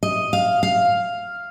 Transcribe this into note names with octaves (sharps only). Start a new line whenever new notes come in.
D#5
F5
F5